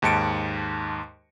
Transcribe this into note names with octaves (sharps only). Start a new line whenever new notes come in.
D#2 G#2 A5 C#7 D7